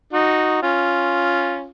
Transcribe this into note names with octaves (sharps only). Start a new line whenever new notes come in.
D#4 F#4
C#4 F4